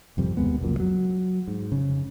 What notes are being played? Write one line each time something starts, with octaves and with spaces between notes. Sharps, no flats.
G#1 F2 C3 G3
D#2 C3 G#3 B3
F1 C#2 F#2 A#2
F#3
G#2
F1 C#3